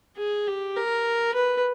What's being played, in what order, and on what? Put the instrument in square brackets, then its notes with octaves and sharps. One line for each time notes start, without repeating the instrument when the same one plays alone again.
[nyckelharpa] G#4
G4
A#4
B4